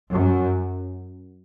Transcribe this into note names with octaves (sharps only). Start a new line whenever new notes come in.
F#2